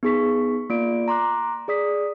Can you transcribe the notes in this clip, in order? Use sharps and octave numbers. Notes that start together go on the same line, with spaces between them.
B3 D#4 G#4 C#6 B6
A#3 F4 D5 D7
A#5 C6 D6 F#6
G#4 D5 D#6 B6